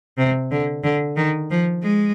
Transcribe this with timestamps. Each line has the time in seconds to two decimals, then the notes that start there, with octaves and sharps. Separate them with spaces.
0.18 C3
0.51 D3
0.84 D3
1.17 D#3
1.51 F3
1.83 G#3